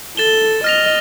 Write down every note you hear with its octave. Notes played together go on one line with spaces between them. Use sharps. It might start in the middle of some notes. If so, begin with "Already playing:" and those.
A4 A6 E7 G7
D#5 F6 A#6 F7